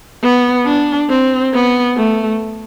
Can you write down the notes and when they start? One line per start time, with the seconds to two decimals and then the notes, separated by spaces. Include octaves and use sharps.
0.23 B3
0.66 D4
1.09 C4
1.54 B3
1.97 A3